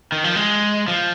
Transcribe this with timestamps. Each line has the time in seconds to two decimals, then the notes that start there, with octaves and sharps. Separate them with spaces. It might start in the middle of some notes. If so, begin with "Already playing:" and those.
0.12 D#3
0.24 F3
0.36 G#3
0.88 F3